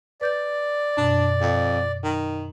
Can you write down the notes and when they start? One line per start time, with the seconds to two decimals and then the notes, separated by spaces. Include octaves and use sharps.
0.21 B4 D5 G6 A6
0.97 F#2 B2 D4
1.41 F2
2.04 D#3